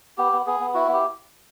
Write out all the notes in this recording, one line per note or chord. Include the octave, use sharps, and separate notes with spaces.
B3 G4
B3
B3 G#4
B3
E4 F#4
B3
G4